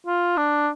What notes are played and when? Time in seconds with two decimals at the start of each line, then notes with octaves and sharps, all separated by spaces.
0.07 F4
0.37 D4